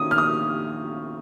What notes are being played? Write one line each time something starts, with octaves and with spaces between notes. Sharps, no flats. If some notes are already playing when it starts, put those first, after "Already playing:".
Already playing: D#3 A#3 C#4 D#6
F6
D#6